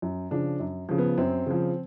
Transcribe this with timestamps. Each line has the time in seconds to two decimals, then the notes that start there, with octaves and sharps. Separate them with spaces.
0.02 F#2
0.31 C#3 F3 D4
0.60 F#2
0.89 C#3 F3
0.98 B3
1.18 F#2 C4
1.46 C#3 F3